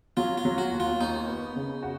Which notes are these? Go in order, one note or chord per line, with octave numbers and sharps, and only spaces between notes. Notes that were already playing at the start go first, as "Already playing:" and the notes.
F#3 F4
F4
F#3
F#4
D#2
F4
D#2 D#4
B3
C#3
F#4